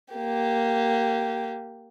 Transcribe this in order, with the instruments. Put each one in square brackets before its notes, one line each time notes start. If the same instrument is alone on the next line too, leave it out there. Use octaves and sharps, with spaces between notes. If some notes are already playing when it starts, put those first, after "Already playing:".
[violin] A#3 G4